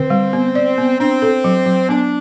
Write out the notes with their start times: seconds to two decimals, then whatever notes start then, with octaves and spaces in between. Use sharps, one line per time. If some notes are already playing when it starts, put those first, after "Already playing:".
Already playing: D3 C4
0.10 G3
0.33 B3
0.55 D5
0.78 B3
0.99 C4 D4
1.22 A4
1.44 F#3
1.66 F#3
1.89 B3 D4